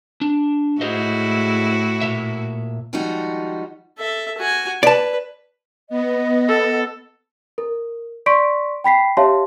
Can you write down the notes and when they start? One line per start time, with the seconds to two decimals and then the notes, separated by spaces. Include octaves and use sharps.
0.21 D4
0.81 A2 E4 F#4 G#4 C5 D#5
2.01 A#2 E5
2.93 D#3 F3 G3 G#3 D#4 F#4
3.99 A4 E5
4.38 F#4 G#5
4.83 B4 D5 A5
5.90 B3 D#5
6.48 A4
7.58 A#4
8.26 D5 C6 C#6 B6 D7
8.84 G5 B5 B6 C7
9.17 G4 C#5 E5 F5 A5 C6